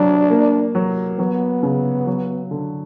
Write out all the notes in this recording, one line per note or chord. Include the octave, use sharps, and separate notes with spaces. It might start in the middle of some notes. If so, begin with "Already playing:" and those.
Already playing: F#3 D4
A#3
F#3
F#3 B3
C#3
F#3
D3